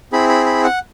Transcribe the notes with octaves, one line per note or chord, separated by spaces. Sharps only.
C4 E4 G#4 B5
B5
B5
F#5